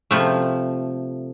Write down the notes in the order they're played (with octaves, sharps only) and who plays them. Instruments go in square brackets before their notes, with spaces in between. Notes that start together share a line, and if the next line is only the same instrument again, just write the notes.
[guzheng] C3 F3 A3